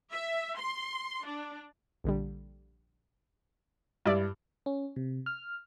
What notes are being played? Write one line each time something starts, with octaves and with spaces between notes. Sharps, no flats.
E5
C6
D4
A#1 D3 G3
G2 E4 D5
C#4
C3
F6